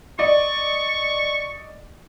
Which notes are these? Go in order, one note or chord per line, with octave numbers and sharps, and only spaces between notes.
D5 D#5 C#6